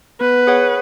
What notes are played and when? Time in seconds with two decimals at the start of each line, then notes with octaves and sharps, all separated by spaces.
0.21 B3 B4
0.47 G#4 C#5 F#5